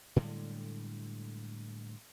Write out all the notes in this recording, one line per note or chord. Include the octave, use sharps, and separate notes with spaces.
A2 D3 G3 G#3